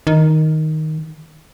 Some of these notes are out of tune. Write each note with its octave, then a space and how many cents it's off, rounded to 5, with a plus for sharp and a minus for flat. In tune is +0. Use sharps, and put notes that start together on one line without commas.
D#3 +5